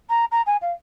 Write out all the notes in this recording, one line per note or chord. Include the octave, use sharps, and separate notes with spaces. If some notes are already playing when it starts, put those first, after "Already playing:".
A#5
A#5
G#5
F5